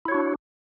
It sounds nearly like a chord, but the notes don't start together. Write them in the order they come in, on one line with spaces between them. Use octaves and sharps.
E4 C#5 F#4 D4